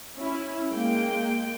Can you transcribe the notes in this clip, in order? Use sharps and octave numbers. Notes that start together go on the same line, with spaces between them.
C#4 E4
G#3 A#3 G5